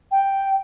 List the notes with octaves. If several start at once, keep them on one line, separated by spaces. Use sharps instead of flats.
G5